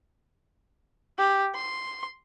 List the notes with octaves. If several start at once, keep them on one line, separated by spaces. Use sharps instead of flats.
G4
C6